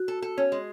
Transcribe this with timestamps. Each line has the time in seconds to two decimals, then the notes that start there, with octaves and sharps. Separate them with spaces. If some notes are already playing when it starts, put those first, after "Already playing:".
Already playing: F#4
0.08 A4
0.22 A4
0.38 C#4
0.52 G#3